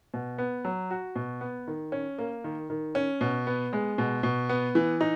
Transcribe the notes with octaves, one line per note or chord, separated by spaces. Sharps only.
B2
B3
F#3
F#4
B2
B3
D#3
C#4
A#3
D#3
D#3
C#4
B2
B3
G#3
B2
B2
B3
E3
D#4